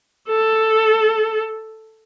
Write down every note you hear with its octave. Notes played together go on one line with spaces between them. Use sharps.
A4